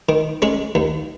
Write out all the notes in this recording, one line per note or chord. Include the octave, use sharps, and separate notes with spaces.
D#3
G#3 C#4 G#4
D#2